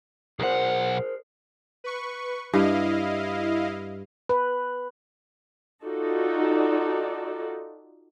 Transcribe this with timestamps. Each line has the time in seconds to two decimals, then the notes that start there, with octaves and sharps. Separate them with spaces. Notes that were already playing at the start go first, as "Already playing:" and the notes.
0.39 B1 G#4 A#4 C5 F#5
1.84 B4 C#6
2.53 G2 E4 D#5 F5
4.29 B4
5.83 D#4 F4 F#4 A4 D5